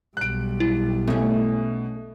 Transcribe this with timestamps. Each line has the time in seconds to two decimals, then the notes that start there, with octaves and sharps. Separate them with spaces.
0.17 B1 G3 F#6 D7
0.60 E4
1.08 B2 A3 C#4